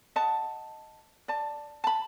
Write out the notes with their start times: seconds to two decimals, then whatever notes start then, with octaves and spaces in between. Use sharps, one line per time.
0.16 D#5 F#5 A5
1.28 D5 A5
1.84 A5 B5